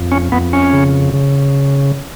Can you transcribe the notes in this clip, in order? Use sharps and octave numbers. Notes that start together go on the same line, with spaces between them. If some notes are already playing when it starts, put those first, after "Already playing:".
Already playing: F2
C#4
F2 B3
C#4
C#3
C#3